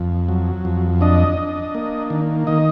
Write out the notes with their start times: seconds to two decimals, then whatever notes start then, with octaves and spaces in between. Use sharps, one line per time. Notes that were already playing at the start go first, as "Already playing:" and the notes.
Already playing: F2
0.29 F#3
0.65 F2
1.01 D4 D#5
1.37 D4
1.75 A#3
2.10 D#3
2.47 D#3 D#5